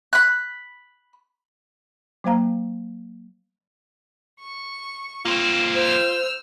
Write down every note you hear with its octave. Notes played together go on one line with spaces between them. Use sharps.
B5 F#6
F#3 A#3 C5 F5 A#5
C#6
A#3 C4 F4
C5 E6 F6